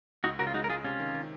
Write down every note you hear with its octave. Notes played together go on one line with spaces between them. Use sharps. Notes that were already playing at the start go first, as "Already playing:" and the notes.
C#2 D#4 F#4
C#3 F#4 A#4
F4
G#3 D#4 F#4
A#4
G#3 F4 G#4
C3 C#4 F4
D#3
D#3